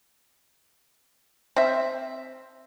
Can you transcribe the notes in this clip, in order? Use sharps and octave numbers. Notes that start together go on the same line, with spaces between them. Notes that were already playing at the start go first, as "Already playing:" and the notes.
C4 E5